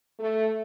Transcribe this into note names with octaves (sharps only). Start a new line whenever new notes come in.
A3